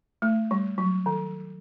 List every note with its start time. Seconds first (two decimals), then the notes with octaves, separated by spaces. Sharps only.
0.22 A3
0.51 G3
0.78 F#3
1.06 D#3